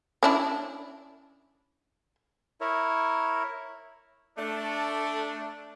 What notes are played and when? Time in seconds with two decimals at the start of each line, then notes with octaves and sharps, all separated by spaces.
0.23 C#4 D4 E4
2.61 E4 A#4 C#5
4.38 A3 D4